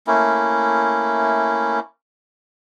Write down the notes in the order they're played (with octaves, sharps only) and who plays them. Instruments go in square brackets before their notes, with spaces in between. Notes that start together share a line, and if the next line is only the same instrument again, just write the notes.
[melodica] A3 A#3 C#4 E4